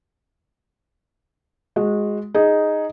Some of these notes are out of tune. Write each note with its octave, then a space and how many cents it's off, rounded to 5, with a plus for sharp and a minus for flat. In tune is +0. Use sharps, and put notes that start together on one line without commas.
G#3 +0 F#4 -20
D#4 +0 G#4 +0